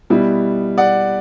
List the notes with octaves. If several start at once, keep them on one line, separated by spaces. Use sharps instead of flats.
B2 G3 B3 E4
D5 F#5